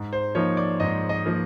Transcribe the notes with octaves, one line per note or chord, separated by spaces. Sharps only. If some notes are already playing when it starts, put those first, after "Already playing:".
Already playing: G#2
C5
F3 A#3 D#4 C#5
D5
G#2 D#5
D#5
F3 A#3 D#4